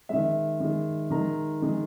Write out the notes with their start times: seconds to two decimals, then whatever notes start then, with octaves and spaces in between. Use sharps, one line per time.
0.09 D#3 G#3 E5
0.60 D#3 G#3
1.10 D#3 G#3 A#5
1.62 D#3 G#3